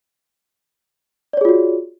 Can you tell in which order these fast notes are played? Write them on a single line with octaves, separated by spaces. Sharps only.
D5 C#5 G#4 F4 F#4